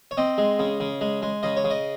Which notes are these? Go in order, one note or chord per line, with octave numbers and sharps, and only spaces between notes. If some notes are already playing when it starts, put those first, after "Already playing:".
C#5
C4 D#5
G#3
C#3
C#3
G#3
G#3
C#3 D#5
C#5
C#3
D#5